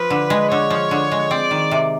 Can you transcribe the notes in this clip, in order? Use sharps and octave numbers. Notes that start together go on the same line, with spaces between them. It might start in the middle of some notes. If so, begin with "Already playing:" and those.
Already playing: F3 B4
D3
G#3
D3 C#5
F3
D3
G#3
C4 D5
D#3
C3